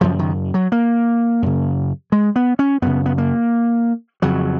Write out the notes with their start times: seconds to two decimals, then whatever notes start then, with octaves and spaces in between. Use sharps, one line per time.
0.01 F#2 C#3 F3
0.19 D#3
0.54 F#3
0.72 A#3
1.42 F#2 C#3
2.12 G#3
2.36 B3
2.59 C#4
2.82 F#2 C#3 B3
3.06 B3
3.18 A#3
4.22 F2 C#3 F#3